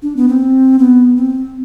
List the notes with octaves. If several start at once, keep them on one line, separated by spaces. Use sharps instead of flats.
D4
B3
C4
B3
C4